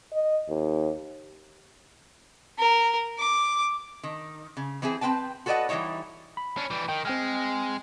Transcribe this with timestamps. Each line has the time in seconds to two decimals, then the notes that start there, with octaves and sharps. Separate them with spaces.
0.13 D#5
0.48 D#2
2.58 A#4
3.18 D6
4.03 D#3
4.57 C#3
4.82 E3 C4 E4 G#4
5.01 C4 D#4 B4 G5 A5
5.46 F#4 A4 B4 D5 D#5 F#5
5.69 E3 G3 D#4 E4 C#5
6.37 B5
6.57 C#4 D4
6.70 E3 G3
6.89 D#3 G5
7.05 G#3 C4 G5 F6